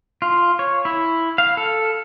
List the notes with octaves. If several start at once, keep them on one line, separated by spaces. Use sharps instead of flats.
F4
C#5
E4
F5
A4